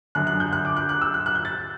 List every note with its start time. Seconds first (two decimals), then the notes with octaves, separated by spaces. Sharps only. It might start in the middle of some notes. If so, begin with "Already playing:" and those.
0.15 F#2 D3 F#6
0.27 F#6
0.40 G6
0.53 F#6
0.65 D6
0.77 F#6
0.89 F#6
1.02 E6
1.14 F#6
1.26 F#6
1.35 G6
1.45 A6